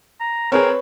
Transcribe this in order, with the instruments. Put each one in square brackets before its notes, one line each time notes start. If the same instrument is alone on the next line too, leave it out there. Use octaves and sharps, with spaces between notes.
[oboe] A#5
[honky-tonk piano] C4 G#4 [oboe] A#4 [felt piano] B4 C#5